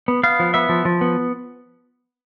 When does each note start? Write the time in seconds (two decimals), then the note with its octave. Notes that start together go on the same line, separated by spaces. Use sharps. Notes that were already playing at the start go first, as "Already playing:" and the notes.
0.08 B3
0.23 B3 F5
0.40 F3
0.54 B3 E5
0.69 F3
0.85 F3
1.01 B3